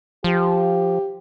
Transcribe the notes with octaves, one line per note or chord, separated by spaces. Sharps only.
F3 G4